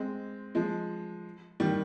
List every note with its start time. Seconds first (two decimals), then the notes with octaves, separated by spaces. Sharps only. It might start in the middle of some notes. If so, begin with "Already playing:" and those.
Already playing: G#3 C4
0.55 F3 G#3
1.60 D#3 G3